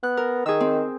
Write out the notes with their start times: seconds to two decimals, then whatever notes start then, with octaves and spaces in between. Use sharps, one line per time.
0.03 B3 F#6
0.17 A#4
0.46 D#3 G#4 E6
0.60 C4